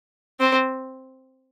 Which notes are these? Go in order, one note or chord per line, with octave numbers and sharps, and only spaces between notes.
C4